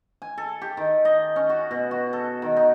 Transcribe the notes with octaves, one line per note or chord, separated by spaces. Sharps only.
G#5
A4
G4
D#3
D#5
C#4
F#4
B2
F#4
A4
D#3
D#4